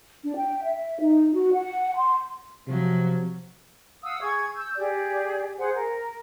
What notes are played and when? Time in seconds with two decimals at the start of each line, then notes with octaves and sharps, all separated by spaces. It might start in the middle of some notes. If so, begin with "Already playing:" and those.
0.23 D4
0.36 G5
0.63 E5
1.00 D#4
1.33 F#4
1.53 F#5
1.96 C6
2.67 C3 F3 F#3
4.03 F5 F#5 D#6 E6
4.22 G#4 C#6 G#6
4.55 E6 G6
4.76 G4 G#4 D5
5.58 G#4 C5 F#5
5.74 A#4